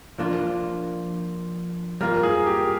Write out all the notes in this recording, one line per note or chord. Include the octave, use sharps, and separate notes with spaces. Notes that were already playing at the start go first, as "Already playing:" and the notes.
F3 A#3 D4 F4
G3 A#3 F4 A#4
G#4
G4